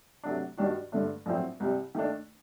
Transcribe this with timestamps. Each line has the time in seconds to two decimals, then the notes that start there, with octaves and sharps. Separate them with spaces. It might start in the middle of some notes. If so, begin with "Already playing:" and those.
0.24 C3 F#3 A3 D4
0.57 G2 D#3 G3 D4 F#4
0.92 G2 D3 A3 D4
1.26 A#1 A2 F#3 C4
1.60 C2 C3 G3
1.95 D#3 A3 D4